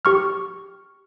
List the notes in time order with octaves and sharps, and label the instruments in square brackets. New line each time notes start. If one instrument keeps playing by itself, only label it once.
[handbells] G4 C#6 F6